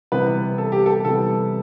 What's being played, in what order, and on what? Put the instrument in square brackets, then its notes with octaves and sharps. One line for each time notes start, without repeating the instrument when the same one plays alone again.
[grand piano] C3 E3 G3 B3 B4
A4
G4
A4
C3 E3 G3 B3 A4